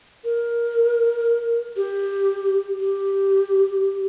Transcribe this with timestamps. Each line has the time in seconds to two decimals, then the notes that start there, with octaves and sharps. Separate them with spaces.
0.24 A#4
1.76 G4
2.80 G4